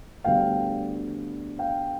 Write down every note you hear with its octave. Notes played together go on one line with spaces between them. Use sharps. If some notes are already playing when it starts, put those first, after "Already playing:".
D2 D3 G3 B3 F5 G5
F5 G5